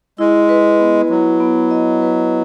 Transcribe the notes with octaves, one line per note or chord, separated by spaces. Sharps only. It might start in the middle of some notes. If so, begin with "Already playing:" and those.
G#3 E4
B4
B3
F#3 E4
B3
D#5
B4